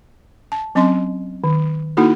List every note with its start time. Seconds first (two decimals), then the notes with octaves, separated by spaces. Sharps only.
0.52 A5
0.75 F#3 C4 C#4 D#5 C6
1.44 D#3
1.97 A#3 D#4 E4 F#4 A4